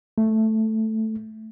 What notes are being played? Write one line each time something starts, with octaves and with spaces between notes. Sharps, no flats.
A3